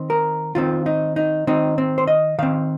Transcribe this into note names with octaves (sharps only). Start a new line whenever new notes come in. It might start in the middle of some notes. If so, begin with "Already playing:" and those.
Already playing: D#3 C4
A#4
D#3 C4 F4
D#4
D#4
D#3 C4 D#4
C4
C5
D#5
D#3 C4 F5